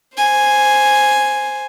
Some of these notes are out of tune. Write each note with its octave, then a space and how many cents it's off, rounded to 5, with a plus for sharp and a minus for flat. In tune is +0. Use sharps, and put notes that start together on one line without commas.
C5 +0 G#5 +0